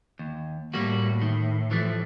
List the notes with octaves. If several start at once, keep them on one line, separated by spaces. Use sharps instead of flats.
D#2
A2 G3 A#3 F#4
D#3
E3 F3 A3